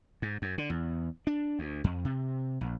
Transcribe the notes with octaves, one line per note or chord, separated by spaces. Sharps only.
G#2
F#2
D3
E2
D4
D2
F2
C3
A#1